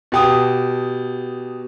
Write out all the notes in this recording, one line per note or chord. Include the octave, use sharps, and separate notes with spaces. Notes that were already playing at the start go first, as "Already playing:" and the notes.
B2 G4 D#6